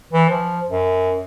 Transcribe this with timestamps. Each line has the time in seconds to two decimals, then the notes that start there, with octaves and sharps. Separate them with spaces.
0.13 E3
0.30 F3
0.68 F#2